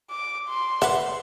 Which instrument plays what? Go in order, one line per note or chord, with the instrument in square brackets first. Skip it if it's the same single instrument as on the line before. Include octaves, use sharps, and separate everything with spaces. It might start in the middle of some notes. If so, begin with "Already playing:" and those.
[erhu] D6
C6
[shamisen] B4 E5 [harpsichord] F#5